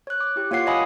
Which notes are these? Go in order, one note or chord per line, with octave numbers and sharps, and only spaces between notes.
C#5 F#6
D6
E4 G4
A#3 F4 C#5 F#5 C7
C#5 D#5 F5 G#5 B5 D#6